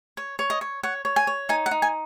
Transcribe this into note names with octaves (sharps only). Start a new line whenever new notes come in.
C#5
C#5
D#5
C#5
C#5 F#5
C#5
G#5
C#5
D#4 G#5
F#5
D#4
G#5